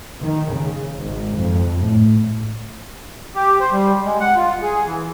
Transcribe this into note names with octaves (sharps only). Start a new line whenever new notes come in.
D#3
C#3
G#1
F2
A2
G4
C5
G3
G#3
F#5
F4
G#4
E3